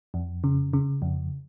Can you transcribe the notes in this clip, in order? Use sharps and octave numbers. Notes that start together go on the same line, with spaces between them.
F2
C#3
C#3
F2